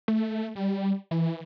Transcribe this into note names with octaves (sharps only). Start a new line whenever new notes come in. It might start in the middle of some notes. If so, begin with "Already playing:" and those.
A3
G3
E3